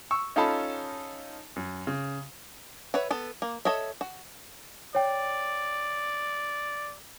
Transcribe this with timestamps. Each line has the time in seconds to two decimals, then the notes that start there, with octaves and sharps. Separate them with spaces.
0.11 C#6 E6
0.36 C#4 D#4 F4 A4 A5 B5
1.56 F#2
1.87 C#3
2.94 B4 C#5 E5 F#5
3.11 B3 A4
3.42 A#3
3.65 A4 C#5 D#5 E5
4.01 F#4
4.95 C#5 D5 G5